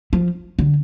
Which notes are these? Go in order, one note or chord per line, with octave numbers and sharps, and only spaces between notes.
F3
D3